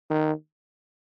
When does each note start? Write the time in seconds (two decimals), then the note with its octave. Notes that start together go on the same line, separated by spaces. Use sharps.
0.10 D#3